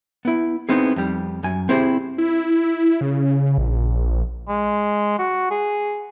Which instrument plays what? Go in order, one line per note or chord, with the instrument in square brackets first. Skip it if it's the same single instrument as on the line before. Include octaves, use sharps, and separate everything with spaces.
[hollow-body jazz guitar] B3 E4
B3 C4 D#4 E4 G#4
F2 G3
F#2 G#5
C4 E4 G4 G#4 C5
[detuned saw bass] E4
C#3
A#1
[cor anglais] G#3
F#4
G#4